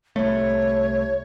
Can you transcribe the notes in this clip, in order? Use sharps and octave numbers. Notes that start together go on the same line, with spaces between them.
C2 A3 C#5